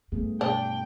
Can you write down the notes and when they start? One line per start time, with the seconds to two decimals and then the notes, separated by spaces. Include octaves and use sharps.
0.12 G2 A3 B3 G#4
0.41 B2 D4 G5